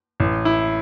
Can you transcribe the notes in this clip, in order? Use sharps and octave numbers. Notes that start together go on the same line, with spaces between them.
A1
E4